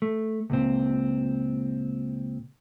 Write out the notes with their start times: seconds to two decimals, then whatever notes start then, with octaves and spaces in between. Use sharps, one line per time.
0.02 A3
0.50 C#2 A#2 C4